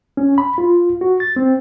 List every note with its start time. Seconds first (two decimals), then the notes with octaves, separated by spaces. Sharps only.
0.17 C#4
0.38 B5
0.58 F4
1.01 F#4
1.20 A6
1.36 C4